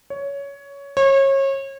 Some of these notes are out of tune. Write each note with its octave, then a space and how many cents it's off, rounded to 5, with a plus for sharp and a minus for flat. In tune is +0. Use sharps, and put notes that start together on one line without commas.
C#5 +15
C#5 -30